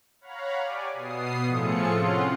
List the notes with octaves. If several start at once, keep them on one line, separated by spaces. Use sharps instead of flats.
C#5 F5 F#5 A#5 B5
G4 D5 G#5
B2 B3 D#6 C7
A2 F3 F4 G#4 A4 C#7
C3 C4 C#4 F4 F#5 C6